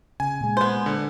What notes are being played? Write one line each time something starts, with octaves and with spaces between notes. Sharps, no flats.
C#3 G#5
A#2 G#3
B3 C5
D3